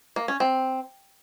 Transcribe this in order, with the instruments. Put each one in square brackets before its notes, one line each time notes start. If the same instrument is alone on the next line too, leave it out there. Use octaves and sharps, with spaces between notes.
[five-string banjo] A#3
C#4
C4